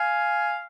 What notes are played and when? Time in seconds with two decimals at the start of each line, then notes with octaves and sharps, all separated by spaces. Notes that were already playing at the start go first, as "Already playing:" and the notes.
Already playing: F5 G#5